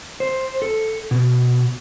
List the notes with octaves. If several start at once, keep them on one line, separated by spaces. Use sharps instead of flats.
C5
A4
B2